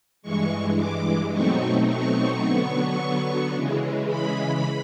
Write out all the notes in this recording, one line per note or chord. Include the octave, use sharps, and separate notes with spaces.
G2 E3 G#3 C#6
D6
B2 F#3 A3 C4 D#4 C#6
C#6
D3 F#3 B3
C#3 E3 G#3
B5